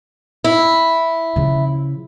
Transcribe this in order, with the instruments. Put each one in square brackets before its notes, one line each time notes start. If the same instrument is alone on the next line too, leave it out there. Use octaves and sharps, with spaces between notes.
[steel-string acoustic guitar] E4
[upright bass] C#3 F3